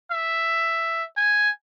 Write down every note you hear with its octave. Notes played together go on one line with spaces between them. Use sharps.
E5
G#5